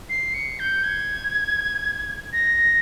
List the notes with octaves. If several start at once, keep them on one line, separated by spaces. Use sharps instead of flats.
C7
C#7
G6
G#6
A#6